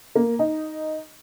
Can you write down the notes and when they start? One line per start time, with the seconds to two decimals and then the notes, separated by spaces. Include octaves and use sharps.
0.15 A#3
0.39 D#4